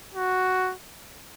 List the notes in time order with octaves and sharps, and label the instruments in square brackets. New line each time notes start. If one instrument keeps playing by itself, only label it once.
[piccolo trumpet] F#4